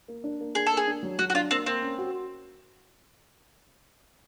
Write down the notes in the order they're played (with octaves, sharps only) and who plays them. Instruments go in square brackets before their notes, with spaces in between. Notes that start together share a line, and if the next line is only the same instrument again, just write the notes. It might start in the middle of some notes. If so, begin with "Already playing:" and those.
[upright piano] A#3
D4
A#3
[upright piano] D4 [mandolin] G#4
[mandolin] A4
[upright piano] A#3
[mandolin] G#4
[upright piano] D4
F#3
[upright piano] F#3 [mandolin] F#4
[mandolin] F#4
[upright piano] D4 [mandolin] F4
[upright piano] A#3 [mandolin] C4
[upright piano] A#3 [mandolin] C4
[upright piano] C#4
F#4